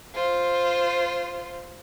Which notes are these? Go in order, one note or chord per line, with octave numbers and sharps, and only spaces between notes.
F4 C5